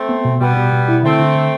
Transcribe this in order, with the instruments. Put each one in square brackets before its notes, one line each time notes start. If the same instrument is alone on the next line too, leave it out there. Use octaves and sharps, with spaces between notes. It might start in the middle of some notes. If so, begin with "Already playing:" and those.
Already playing: [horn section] A3 C4
[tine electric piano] B3
B2
[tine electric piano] B2 [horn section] G3 B3
[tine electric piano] B2
B2
E4
[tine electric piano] D3 [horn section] A3 C4
[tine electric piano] D3
D3